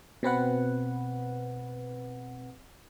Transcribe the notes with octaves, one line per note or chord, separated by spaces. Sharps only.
B2 C4 B4 F#5